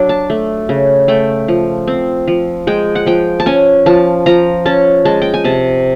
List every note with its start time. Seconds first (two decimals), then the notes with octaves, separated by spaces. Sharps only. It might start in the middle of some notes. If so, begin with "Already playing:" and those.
Already playing: F#3 D4
0.09 A5
0.30 A3
0.69 C#3
1.08 A3 G5
1.48 F3
1.87 C4
2.28 F3
2.67 G#3 G5
2.95 F#5
3.06 F3 G5
3.40 A5
3.46 C#4 G#5
3.86 F3 A5
4.26 F3 A#5
4.66 C#4 A5
5.05 G#3 A5
5.22 G5
5.34 G#5
5.44 C3 A5